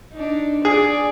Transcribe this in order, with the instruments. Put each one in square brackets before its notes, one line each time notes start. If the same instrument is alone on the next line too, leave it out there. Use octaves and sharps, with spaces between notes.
[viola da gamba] D4 D#4
[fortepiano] G#4 [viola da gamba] D5